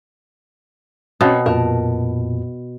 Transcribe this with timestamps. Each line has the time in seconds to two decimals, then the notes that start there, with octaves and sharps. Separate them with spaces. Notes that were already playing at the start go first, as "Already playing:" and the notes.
1.21 B2 C4 C#4 F#4
1.46 F2 A#2 A#4 A5